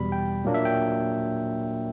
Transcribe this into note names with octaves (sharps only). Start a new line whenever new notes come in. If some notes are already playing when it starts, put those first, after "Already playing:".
Already playing: E2 B2 G3 B5
G5
A#2 F#3 A#3 D4
E5
G5